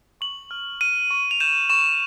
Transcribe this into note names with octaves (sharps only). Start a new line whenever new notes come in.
C#6 F#7
F6
F6 D#7
C#6
F7
G6 E7
C#6 E7